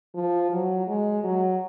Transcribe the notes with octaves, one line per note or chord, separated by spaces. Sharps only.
F3
F#3
G#3
F#3